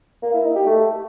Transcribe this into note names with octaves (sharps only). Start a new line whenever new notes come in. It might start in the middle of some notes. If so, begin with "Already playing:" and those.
A#3
E4
D#4
G4
A3